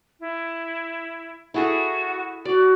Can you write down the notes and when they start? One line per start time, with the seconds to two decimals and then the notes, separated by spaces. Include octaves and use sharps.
0.20 E4
1.54 E4 F#4 G#4 A4
2.45 F#4 D5